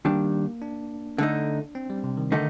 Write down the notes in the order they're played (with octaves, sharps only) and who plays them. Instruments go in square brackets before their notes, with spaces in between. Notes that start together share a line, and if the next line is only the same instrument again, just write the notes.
[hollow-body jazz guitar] D#3 G3 D4 [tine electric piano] A#3
[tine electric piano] D4
[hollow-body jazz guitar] D3 A3 D#4
[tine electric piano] C4
G3
C3
D#3
[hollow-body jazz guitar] D3 A3 D#4 [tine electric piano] D#3